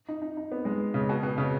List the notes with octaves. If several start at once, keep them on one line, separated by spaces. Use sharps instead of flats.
D#4
D#4
D#4
B3
G#3
C#3
B2
B2
C#3